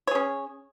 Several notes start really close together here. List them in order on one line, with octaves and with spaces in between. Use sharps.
C#5 G#4 C#4